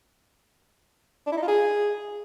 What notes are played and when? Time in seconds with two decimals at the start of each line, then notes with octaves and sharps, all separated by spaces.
1.27 D4
1.32 E4
1.37 D#4
1.42 F4
1.48 G#4